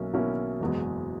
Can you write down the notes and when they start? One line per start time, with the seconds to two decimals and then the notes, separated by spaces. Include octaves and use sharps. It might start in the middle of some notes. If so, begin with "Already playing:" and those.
Already playing: B1 B2 A#3 C#4 E4
0.13 B1 B2 A#3 C#4 E4
0.60 F#1 E2 B2 G#3